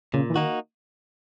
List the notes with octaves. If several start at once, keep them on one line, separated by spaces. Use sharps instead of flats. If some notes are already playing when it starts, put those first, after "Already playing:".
A#2 C#3
E3
D#3 A#3 D#4 F#4